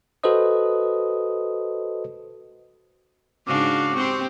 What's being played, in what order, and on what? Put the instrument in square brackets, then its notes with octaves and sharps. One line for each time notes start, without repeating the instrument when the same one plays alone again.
[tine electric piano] F#4 A4 B4 C5 D#5 D#6
[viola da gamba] G#2 C#3 D4 [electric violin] F#4 F5 [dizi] D6
[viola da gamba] C4 G4 [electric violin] C6 C#6